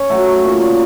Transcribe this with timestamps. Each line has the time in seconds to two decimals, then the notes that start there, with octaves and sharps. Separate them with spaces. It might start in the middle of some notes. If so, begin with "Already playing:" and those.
Already playing: C#4 C#5
0.10 F#3 A3
0.44 A#2